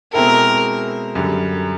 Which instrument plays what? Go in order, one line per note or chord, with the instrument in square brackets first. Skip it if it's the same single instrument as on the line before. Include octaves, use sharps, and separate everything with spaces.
[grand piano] B2 G#3 C4 E4 A4 [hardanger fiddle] A#4
[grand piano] F#2 D3 G3